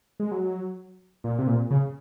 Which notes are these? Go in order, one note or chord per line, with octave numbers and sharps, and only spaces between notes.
G#3
F#3
A#2
C3
A#2
C#3